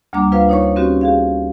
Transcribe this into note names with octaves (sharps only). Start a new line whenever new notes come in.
D2 G3 A#3 D4 A#5 D6
F4 B4 C5 F5
D#4 C#5 C#6
C#5
C4 C#4 F#4 G4
G4 G#4 F5